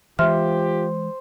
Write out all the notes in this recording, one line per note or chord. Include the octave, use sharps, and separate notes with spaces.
E3 G#3 F4 G4 C5 E5 F6